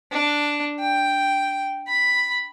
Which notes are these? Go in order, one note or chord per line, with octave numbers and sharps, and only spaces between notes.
D4
G5
B5